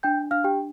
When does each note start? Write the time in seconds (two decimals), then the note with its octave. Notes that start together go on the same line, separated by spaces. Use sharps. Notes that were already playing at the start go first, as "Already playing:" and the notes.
0.03 D4 G5 G6
0.31 D4 F5 F6
0.44 G4 G5